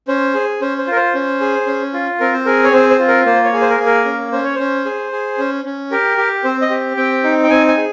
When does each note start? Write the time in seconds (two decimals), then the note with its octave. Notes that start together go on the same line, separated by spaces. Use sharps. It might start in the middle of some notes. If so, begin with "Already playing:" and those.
0.08 C#4 C5
0.34 G#4
0.61 C#4 C5
0.78 C5
0.87 F4 A#4
0.96 C5
1.14 C#4
1.41 G#4
1.66 C#4
1.93 F4
2.20 C4 A#4
2.33 C5
2.45 G#4 A#4
2.64 C#5
2.73 C4 C5
2.91 C5
2.99 F4
3.08 A#4
3.26 A#3 C5
3.44 C#5
3.53 G#4
3.61 C5
3.70 A#4
3.79 A#3
3.86 A#4
4.05 C#4
4.32 C#4 C5
4.44 C#5
4.55 C#4 C5
4.85 G#4
5.12 G#4
5.38 C#4
5.65 C#4
5.91 G4 A#4
6.18 G4
6.44 C4 C5
6.62 D#5
6.70 G4
6.97 C4 G5
7.24 D#4
7.44 G5
7.50 C4 G#5
7.68 G#5
7.77 G#4